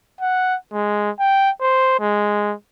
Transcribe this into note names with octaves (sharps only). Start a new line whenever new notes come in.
F#5
G#3
G5
C5
G#3